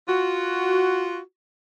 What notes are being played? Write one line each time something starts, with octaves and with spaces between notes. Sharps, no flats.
F4 F#4